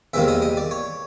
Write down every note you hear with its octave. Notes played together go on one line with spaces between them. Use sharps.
E2 C3 D#3 G3 A#3 E5
D#5
D#5
D5
C#5